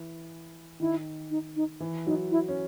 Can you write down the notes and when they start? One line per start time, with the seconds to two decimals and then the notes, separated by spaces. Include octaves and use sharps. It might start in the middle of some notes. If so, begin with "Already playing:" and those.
Already playing: E3
0.80 D#3 E4
1.31 D#4
1.56 D#4
1.80 E3
2.06 F#3 D#4
2.31 E4
2.48 C#4